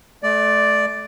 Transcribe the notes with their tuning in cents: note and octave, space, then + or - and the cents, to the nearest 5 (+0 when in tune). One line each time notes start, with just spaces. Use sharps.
A3 -35 D5 +0